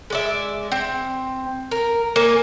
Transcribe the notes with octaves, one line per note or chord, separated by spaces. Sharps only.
G#3 D5 E5
C4
A#4
A#3 D5 G#5